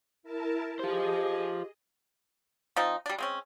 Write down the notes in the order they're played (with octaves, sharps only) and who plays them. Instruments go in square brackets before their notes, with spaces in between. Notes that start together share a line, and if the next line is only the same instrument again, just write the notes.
[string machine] E4 A#4 A5
[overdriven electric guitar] F4 C5 [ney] G4 [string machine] G#4 D#5
[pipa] F3 C4 D#4
G3 D4
G#3 C4 C#4